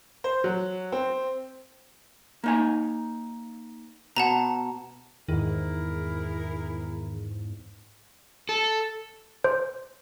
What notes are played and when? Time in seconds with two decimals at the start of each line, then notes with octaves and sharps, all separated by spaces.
0.24 C5
0.44 F#3
0.92 C4
2.44 A#3 D#4 G#5
4.16 B2 F#5 A5 A#5
5.29 E2 G#2 D#3 E4 G#4 A#4
8.49 A4
9.44 C5